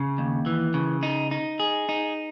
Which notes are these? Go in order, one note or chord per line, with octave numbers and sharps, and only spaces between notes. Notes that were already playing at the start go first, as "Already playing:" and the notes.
Already playing: C#3
D#2
E3
C#3
D#4
D#4
G#4
D#4